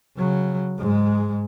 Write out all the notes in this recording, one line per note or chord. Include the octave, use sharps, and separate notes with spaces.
C#3 F#3
G#2 G#3